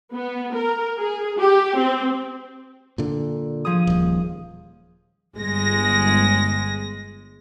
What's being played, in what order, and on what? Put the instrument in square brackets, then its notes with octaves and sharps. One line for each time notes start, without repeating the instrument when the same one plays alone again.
[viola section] B3
A#4
G#4
G4
C4
[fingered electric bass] A#2 D3
[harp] F3 G#4 D#6
[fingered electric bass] D#1 D#2
[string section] G1 G#3 A#6